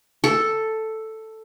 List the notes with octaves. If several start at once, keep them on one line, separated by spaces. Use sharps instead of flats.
A4